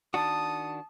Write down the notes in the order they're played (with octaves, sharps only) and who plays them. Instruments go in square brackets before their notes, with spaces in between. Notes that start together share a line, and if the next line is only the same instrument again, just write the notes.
[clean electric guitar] D#3 D4 F#4 [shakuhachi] A5 [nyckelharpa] D#6